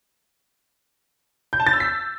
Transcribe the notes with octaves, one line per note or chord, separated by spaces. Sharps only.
G6
A5
A6
E6
B6